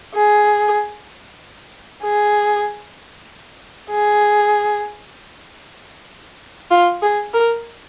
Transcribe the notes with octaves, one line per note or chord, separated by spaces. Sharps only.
G#4
G#4
G#4
F4
G#4
A#4